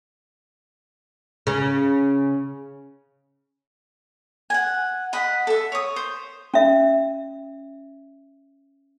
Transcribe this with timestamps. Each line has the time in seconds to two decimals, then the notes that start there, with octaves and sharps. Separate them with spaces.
1.47 C#3
4.50 F#5 G#5
5.13 D#5 F#5 B5
5.47 A4 E5
5.72 C#5 D#6
5.96 C5
6.54 C#4 E5